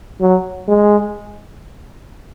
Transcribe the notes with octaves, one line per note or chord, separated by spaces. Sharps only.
F#3
G#3